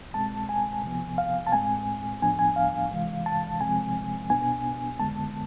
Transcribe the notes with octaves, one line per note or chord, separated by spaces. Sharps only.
C2 B2 G#3 C4 A5
G#5
C3 F3 B3
F5
A5
A2 G#3 C4 G#5
A2 F3 B3 D4 G#5
G#5
F5
C3 E3 G#3
A5
C3 F3 G#3 C4 G#5
C2 B2 B3 D4 G#5
F2 D3 G#3 B3 A5